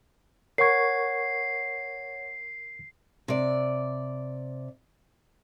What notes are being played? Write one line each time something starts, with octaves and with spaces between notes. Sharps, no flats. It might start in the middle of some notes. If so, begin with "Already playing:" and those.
A#4 C#5 F#5 C#6 G#6 C7
C3 D5